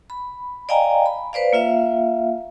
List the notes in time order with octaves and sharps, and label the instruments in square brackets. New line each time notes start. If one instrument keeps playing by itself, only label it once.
[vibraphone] B5
D5 D#5 F5 G5 G#5 A#5
B5
B4 C5 D5 F5
A#3 F4 E5 F5